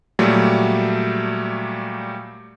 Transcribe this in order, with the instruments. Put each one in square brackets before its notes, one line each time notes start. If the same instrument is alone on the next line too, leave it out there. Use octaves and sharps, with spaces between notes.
[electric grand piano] A#2 F#3 G3 A3